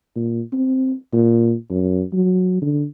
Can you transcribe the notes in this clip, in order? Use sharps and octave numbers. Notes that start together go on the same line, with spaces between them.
A#2
C4
A#2
F#2
F#3
D3